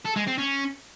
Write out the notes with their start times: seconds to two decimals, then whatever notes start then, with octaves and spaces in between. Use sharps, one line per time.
0.05 A4
0.16 G#3
0.27 C4
0.38 C#4